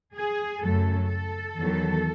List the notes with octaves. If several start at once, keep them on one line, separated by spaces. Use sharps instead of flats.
G#4
F#2 C#3 F#3 A3 A4
A4
E2 D#3 F#3